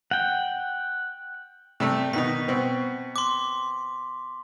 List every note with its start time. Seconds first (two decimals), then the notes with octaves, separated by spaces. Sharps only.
0.11 F#5 G5
1.80 C3 G3 A3
2.13 B2 D#3 D#4 B6
2.48 B2 C4
3.16 C6 D6